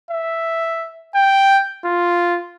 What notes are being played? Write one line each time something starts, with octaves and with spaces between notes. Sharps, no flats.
E5
G5
F4